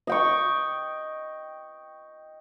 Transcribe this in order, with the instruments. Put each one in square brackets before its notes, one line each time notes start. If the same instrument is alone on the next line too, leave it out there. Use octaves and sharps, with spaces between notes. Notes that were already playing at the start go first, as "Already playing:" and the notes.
[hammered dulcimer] D#5 G5 C#6